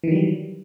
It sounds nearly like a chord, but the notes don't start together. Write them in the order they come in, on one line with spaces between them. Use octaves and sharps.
E3 D#3 F#3 G3